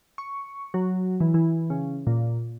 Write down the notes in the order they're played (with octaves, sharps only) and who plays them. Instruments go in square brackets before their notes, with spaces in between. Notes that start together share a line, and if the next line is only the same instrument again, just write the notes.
[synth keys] C#6
F#3
E3
E3
C#3
A#2